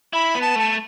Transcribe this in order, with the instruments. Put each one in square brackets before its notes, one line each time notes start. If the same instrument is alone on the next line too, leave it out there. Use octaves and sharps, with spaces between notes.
[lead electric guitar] E4 [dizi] B5
[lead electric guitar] B3
[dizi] A5
[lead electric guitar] A3 [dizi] A5
[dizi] A5